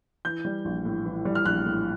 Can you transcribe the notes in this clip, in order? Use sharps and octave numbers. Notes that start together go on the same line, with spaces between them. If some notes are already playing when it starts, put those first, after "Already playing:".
E3 G6
G3
A#1
A2
E3
G3
F6
A#1 F#6
A2